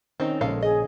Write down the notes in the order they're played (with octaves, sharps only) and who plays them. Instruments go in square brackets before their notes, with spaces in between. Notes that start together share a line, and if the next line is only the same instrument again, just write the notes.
[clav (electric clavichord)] D#3 C#4 [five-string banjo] C4 D#4
[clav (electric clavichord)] A#1 C#3 [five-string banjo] G#3 A4 F5
[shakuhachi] G#4 [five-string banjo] D#5